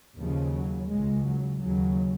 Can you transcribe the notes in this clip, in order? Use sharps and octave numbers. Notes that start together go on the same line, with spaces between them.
D#2 C#3 F3
F#3
C#2 C#3 G#3
F#3
D#2 C#3 F#3